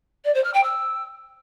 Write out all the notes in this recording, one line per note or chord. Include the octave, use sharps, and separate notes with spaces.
D5
C5
F6
G5
E6